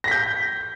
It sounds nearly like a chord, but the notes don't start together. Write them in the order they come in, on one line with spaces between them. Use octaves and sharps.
A#6 B6 G6